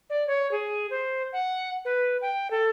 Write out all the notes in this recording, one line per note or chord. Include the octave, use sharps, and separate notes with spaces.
D5
C#5
G#4
C5
F#5
B4
G5
A4